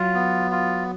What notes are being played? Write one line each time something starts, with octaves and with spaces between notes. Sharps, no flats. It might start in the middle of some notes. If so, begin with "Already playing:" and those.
Already playing: F#3 F4
B3
F4